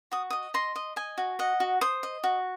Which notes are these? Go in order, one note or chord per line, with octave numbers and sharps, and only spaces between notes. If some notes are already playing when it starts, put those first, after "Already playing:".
F#4 D#6
D#5 D#6
D#5 C6
D#5
D#5 G#5
F#4
D#5 F#5
F#4
C5 D#6
D#5
F#4